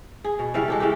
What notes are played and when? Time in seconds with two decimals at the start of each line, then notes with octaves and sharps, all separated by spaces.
0.24 G#4
0.39 B2
0.54 C#3 E3 G3 F5
0.68 G#3 G4 A4
0.80 C#3 E3 G#3 G4